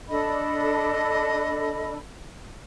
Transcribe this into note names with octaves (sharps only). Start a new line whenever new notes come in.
D4 A4 D#5 B5